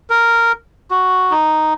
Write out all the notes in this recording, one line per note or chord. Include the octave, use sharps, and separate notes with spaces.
A#4
F#4
D#4